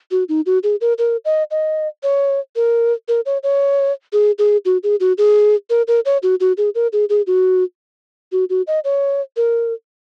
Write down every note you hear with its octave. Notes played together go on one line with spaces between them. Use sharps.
F#4
D#4
F#4
G#4
A#4
A#4
D#5
D#5
C#5
A#4
A#4
C#5
C#5
G#4
G#4
F#4
G#4
F#4
G#4
A#4
A#4
C#5
F#4
F#4
G#4
A#4
G#4
G#4
F#4
F#4
F#4
D#5
C#5
A#4